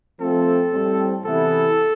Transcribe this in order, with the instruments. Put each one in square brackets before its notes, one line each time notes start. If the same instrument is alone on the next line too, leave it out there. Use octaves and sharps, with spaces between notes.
[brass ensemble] F3 A3 C4 [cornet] A4
[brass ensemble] A2 G3 C4
[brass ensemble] C3 E3 B3 E4 [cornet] A4